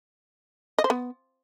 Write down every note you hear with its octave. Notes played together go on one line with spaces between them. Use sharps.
D#5
C5
B3